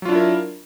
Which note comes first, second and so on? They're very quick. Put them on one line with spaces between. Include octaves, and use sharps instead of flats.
F#3 F4 D4 E4 A#4